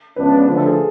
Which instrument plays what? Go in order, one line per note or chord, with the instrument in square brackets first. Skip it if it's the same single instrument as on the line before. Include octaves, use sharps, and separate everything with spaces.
[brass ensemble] C#2 C#3 F3 B3 D4 [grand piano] B4
[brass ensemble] D3 F3 A3 [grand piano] B4
[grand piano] A4
G#4